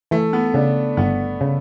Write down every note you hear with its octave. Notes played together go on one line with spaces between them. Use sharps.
E3 A3
B3
C#3 D4
G1 B3
C#3